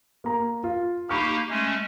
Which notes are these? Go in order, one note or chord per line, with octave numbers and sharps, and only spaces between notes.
A#3 A#5
F4
A#3 D#4 G4 B5 C#6 F6
G#3 A3 C#4